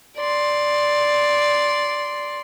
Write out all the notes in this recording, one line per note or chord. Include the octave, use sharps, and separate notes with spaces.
D5 C6